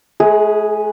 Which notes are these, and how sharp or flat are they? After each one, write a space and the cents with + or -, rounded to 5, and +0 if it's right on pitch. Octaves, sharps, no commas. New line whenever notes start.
A3 -45 G#4 +0 B4 -15